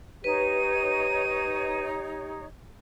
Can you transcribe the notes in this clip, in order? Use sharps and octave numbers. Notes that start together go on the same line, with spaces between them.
D#4 G4 B4 C#5 D#7